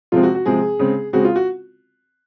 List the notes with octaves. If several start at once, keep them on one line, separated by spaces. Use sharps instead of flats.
C3 F3 G#3 C4 F4
F#4
F#4
C3 F3 G#3 C4 G#4
C#3 G#3 C4
C#3 G#3 C4 F#4
F4
F#4